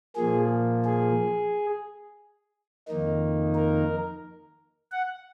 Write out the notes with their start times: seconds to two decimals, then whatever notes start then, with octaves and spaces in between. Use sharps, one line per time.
0.16 A#2 F3 A#3 G#4
0.85 G#4
2.88 F2 D#3 A#3 D#4
3.55 A#4
4.92 F#5